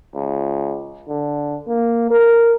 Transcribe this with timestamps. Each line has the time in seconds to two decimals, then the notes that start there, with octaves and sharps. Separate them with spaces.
0.15 C#2
1.09 D3
1.67 A#3
2.11 A#4